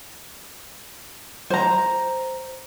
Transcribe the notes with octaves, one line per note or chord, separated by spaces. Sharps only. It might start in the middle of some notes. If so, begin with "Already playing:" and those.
C5 A#5